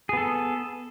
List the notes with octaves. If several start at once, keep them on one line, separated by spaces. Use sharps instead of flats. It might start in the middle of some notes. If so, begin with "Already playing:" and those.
B3 G#4 A4